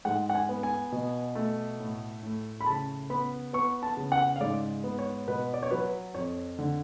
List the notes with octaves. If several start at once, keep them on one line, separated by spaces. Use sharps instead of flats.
G#2 F#5
F#5
G#5
B3
G#5
B2
A3
A2
A2
B5
C#3 A5
B3 B5
B3 C#6
A5
C#3
F#5
F5
G#2 D5
B3
C#5
B2 B4
D5
C#5
F#3 B4
F2 C#5
D3